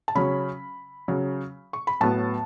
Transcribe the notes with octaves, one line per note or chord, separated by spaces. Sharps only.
A5
C#3 F#3 C#4 B5
C#3 F#3 C#4
C#6
B5
A2 F#3 B3 A5